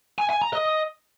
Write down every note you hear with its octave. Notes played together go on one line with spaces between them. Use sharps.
G#5
G#5
A#5
D#5